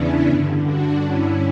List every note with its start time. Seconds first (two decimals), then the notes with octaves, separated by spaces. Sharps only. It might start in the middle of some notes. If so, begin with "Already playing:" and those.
Already playing: E2 C#3 E3 B3 C#4 D4 E4
0.25 G2 D3
0.64 D4 F#4
1.02 G2 D3 C#4 E4